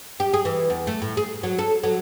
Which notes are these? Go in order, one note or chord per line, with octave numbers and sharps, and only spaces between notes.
G4
G#4
E3
E2
A3
A2
G#4
F#3
A4
F#3